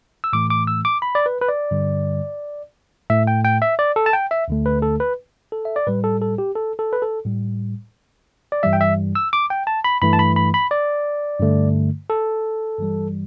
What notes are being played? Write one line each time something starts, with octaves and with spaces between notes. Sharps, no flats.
E6
A2 E3 A3 D6
D6
E6
D6
B5
D5
B4
B4
D5
G2 D3 G3
A2 A3 E5
G5
G5
E5
D5
A4
A5
G5
E5
D2 D3 A3
B4
A4
B4
A4
E5
D5
A2 G3 B4
A4
A4
G4
A4
A4
B4
A4
A2 G3
D5
G2 E3 G3 E5
G5
E5
E6
D6
G5
A5
B5
G2 E3 A3 B5
A5
B5
B5
B5
D5
G2 D3 A3
A4
G2 E3 G3